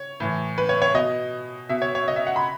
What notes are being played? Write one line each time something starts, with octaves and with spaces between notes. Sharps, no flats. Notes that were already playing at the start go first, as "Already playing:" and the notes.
Already playing: C#5
A2 E3
B4
C#5
C#5
B2 D#5
B2 E5
C#5
C#5
D#5
E5
F#5
B5